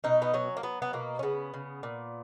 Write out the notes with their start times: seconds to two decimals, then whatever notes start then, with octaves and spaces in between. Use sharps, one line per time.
0.04 B2 D#4
0.22 B3
0.34 F#3 C#4
0.57 A#3
0.63 F#3 B3
0.82 B3
0.93 B2 A#3
1.19 C#4
1.23 C#3 B3
1.54 C#3
1.83 A#2